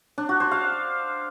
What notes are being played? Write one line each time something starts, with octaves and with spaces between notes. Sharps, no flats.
D4
F#4
C5
F5